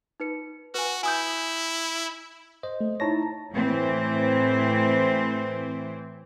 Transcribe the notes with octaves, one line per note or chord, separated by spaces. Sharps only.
D#4 B4 C#7
F#4 B4 G#5
E4 G#5 D#6 G6
C5 D#5
A3
D#4 E4 C#5 A5 A#5 A#6
A2 E3 C4